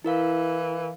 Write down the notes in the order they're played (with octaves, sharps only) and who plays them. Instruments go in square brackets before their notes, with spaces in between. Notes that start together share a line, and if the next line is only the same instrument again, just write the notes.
[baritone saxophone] E3 [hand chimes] E4 A#4 F5